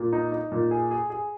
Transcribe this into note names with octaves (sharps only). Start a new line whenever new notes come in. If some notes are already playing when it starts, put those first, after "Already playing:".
Already playing: A#2
D#4
D#4
A#2
G#4
G#4
G#4